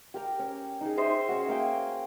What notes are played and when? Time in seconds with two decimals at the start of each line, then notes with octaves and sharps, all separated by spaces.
0.14 G4 A#4 A#5
0.39 C#4
0.81 D#4 G#4
0.98 C5 D#5 E5
1.29 C#4 F#4
1.49 A#3 F5 G5 G#5